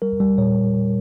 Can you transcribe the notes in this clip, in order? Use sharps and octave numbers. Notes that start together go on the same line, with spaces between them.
G3 A#4
G3
A#2 C#5